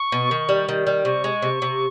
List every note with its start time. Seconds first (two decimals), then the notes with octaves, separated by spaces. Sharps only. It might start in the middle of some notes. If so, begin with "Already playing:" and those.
Already playing: C#6
0.12 B2
0.31 D#3
0.49 G3
0.69 D#3
0.87 G3
1.05 C3 C#6
1.24 G#3
1.42 C3
1.62 C3